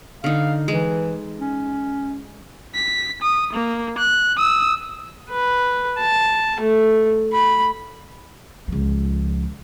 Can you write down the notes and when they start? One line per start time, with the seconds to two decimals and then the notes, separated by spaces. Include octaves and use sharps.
0.24 D3 D#4 F5
0.68 E3 G#3
1.40 C#4
2.74 B6
3.22 D#6
3.53 A#3
3.98 F#6
4.37 D#6 E6
5.30 B4
5.98 A5
6.60 A3
7.33 B5
8.68 C#2 F3